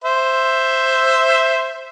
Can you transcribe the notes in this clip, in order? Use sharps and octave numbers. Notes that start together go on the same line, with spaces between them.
C5 E5